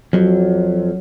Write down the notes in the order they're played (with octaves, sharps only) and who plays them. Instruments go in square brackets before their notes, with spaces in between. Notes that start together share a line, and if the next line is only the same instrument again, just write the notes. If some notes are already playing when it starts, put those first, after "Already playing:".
[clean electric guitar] F2 [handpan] F#3